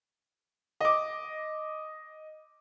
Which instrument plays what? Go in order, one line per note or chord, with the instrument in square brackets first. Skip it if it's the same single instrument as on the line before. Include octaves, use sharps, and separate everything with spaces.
[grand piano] D#5 D6